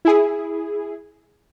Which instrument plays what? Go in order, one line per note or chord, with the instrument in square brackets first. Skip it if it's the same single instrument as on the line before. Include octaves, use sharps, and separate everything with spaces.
[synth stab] E4 G#4